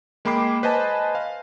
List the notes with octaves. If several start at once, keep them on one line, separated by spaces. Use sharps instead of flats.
G#3 A#3 G5 B5 D6 C7
B4 C5 D#5 G#5 A5
F5